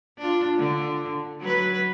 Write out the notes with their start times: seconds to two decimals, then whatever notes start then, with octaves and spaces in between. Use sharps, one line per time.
0.18 D4 F4
0.57 D3
1.41 F#3 B4